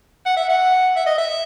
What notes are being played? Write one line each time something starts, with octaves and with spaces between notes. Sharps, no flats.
F#5
E5
F#5
E5
D#5
E5